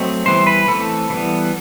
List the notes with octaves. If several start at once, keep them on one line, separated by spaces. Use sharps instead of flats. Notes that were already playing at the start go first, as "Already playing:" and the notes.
Already playing: F#3 A3 C4 D#5
E3 G3 B3 C5
B4
E3 A3 C4 A4
E3 G3 B3